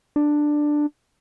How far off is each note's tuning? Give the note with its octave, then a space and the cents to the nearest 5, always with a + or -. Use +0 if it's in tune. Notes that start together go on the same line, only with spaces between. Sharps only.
D4 +10